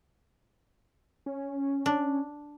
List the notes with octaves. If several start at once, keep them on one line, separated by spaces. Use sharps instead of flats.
C#4
D4